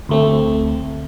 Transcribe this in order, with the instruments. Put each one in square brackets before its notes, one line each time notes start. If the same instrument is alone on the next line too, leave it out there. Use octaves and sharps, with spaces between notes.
[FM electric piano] D2 A3 C4